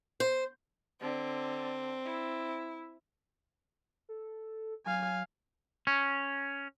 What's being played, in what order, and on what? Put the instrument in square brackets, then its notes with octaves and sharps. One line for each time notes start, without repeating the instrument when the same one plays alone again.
[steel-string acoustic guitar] C5
[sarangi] D3 [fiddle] C4
[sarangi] E4
[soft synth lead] A4
[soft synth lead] F#3 [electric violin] F5 G#5
[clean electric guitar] C#4